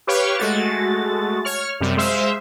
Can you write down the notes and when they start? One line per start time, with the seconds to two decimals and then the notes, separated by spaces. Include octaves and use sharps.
0.07 G4 B4 C#5 F5 G5 C#6
0.38 G#3 A3 F#4 A6
1.45 C#5 C#6 F6
1.80 F#2 C3 G3
1.97 G#3 C5 E5 F5